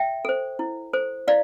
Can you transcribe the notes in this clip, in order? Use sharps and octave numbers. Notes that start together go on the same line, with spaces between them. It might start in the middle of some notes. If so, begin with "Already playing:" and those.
Already playing: E5 G5
A4 C5
E4
A4 C5
E4 D5 F5